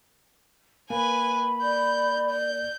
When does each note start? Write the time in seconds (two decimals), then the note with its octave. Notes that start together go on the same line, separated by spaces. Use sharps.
0.90 A#3 B4 G#5 B5
1.62 D5 G6
2.30 G6